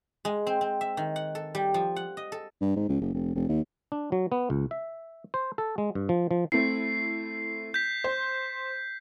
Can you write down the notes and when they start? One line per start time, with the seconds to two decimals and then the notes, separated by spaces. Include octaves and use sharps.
0.25 G#3
0.47 C4
0.61 C4
0.81 E5
0.97 D#3
1.16 F#5
1.35 A4
1.55 G3
1.74 F3
1.96 F#5
2.17 D#5
2.32 A4
2.61 G2
2.76 G#2
2.89 C#2
3.01 F#1
3.14 F1
3.35 F1
3.49 D#2
3.92 D4
4.12 F#3
4.32 B3
4.50 C#2
4.71 E5
5.34 C5
5.58 A4
5.78 G#3
5.95 G2
6.09 F3
6.31 F3
6.52 A3 C4 E4 C7
7.74 G6 B6
8.04 C5